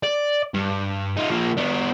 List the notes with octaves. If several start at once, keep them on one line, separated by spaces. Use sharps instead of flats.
D5
G2
D#4 F4
F3 A#3
B3 D4